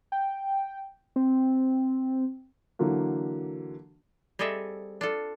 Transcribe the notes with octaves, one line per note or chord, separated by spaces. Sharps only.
G5
C4
D3 E3 F#3 A#3
G3 C4 G#4 A4 D#5 E5
D4 F4 A4